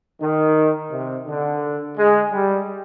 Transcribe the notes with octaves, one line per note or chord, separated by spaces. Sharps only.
D#3
C3
D3
G#3
G3